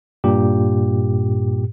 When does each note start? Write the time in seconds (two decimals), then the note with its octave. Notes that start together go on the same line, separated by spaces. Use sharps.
0.24 G2 A#2 G4